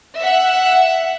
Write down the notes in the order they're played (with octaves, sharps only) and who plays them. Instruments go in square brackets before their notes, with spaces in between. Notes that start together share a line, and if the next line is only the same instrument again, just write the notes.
[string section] E5 F#5